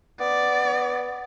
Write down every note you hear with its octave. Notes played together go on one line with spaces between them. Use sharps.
B3 D5